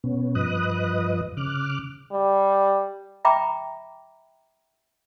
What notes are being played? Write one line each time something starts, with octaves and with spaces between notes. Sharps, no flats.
B2 B3 C#4
G2 F3 B4 D#5 D#6 F#6
C#3 D6 F6 F#6
G3
E5 G5 A#5 B5 D6